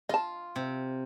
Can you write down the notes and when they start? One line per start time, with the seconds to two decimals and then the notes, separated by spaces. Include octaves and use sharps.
0.09 F4 D#5 A5
0.56 C3